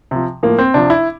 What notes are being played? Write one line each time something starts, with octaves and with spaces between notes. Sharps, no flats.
C3 F3
A2 F3 A#3
C4
C3 F3 D4
E4